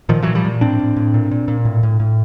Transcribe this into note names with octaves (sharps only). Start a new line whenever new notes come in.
A#2 D#3 F3
A#2 E3 F#3
F3 G3
A#2
A2 C4 D4
A2
A2
A#2
A#2
A#2
A2
A2
A2